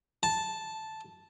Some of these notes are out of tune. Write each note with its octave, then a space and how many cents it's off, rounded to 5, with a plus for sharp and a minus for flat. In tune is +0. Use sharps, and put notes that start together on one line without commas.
A5 -5